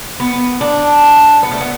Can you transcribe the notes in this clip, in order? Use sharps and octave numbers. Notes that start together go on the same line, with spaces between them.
B3
D4
B3
A3
B3